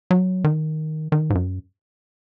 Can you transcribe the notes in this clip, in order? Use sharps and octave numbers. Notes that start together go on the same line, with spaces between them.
F#3
D#3
D#3
G#2
F#2